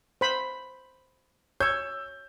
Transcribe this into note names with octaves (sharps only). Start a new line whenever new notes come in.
C5 B5
C#5 E6 G6